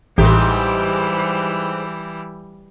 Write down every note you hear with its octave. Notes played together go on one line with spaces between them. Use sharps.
A1 G#2 E3 G3 G4